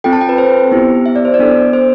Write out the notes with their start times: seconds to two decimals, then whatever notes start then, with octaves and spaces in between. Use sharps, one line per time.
0.04 C4 F4 A4 G5
0.13 A5
0.21 G5
0.29 B4
0.38 C5
0.72 B3 E4 G4
1.06 E5
1.16 D5
1.25 C5
1.34 D5
1.39 B3 D4 A4
1.73 C5